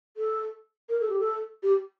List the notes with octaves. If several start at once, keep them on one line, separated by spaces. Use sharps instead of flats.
A4
A#4
A4
G4
A4
G4